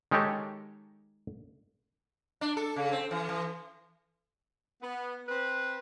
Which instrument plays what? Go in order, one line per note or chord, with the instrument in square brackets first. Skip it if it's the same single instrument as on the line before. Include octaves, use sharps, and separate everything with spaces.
[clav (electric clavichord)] D#3 G#3 D#4 G4 A4 C#5
[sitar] D4
A4
C#3
C4
E3
E3
[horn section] B3
C4 B4